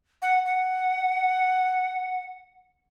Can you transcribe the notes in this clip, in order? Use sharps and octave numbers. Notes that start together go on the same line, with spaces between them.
F#5
F#5